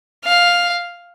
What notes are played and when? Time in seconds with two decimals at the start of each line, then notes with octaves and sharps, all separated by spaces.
0.25 F5